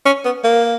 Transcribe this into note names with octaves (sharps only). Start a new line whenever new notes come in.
C#4
B3
A#3